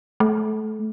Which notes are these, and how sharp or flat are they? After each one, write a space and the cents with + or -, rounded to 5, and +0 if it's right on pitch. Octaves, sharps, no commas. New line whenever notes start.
A3 -25